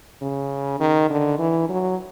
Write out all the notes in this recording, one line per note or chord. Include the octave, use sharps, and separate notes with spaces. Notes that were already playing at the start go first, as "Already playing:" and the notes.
C#3
D#3
D3
E3
F#3